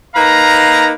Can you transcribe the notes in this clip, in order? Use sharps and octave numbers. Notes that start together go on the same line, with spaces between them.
A#3 D#4 B4 F5 A#5